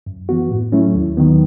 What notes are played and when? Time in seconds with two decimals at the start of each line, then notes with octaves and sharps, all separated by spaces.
0.07 F#2
0.29 E3 B3 F#4
0.51 A2
0.72 F#3 A3 C#4 E4
0.95 D#2
1.17 D#3 F#3 B3